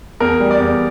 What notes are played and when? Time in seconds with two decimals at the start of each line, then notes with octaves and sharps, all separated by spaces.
0.20 E2 A#4
0.40 G3
0.51 D5
0.60 E2